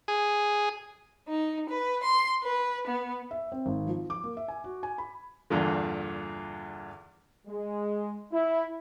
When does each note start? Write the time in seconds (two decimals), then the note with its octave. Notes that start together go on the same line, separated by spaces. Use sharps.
0.08 G#4
1.28 D#4
1.69 B4
2.04 C6
2.43 B4
2.87 B3
3.31 E5
3.52 C4
3.66 G#1
3.87 F3
4.10 D6
4.24 A#3
4.37 E5
4.48 G#5
4.64 F#4
4.83 G#5
4.98 B5
5.50 E2 G2 A#2 D3
7.47 G#3
8.32 E4